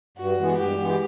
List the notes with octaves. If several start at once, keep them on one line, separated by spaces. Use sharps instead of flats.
G2 F#4
E3 G#3 B3
G2 G4
E3 G#3 B3